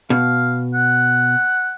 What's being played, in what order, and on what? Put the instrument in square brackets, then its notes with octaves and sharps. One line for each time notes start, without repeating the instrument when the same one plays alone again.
[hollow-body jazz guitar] B2 [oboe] F5
[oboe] F#5